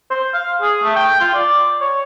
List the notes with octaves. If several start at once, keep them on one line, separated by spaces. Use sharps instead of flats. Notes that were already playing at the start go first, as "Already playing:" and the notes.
C5
F5
G#4
A3
G5
F4
D5
C#5